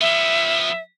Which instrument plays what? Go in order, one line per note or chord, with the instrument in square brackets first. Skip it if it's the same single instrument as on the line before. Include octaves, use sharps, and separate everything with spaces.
[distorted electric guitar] F3 B3 [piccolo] E5